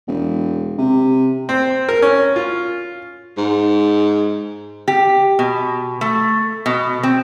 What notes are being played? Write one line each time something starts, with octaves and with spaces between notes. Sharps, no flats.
E1
C3
C4
A#4
C#4
F4
G#2
G4
B2
A3
B2
C4